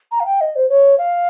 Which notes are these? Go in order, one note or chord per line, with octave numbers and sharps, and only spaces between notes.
A#5
F5
G5
D#5
C5
C#5
F5